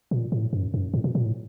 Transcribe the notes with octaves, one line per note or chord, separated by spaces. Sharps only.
A#2
A2
F#2
F#2
A2
A#2
A#2
A2